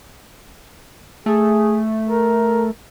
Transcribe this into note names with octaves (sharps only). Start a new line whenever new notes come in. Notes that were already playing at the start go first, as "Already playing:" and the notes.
A3 G#4
A#4